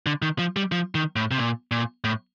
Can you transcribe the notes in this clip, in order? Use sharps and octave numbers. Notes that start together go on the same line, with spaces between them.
D3
D#3
F3
G3
F3
D#3
A2
C3
A#2
A#2
A2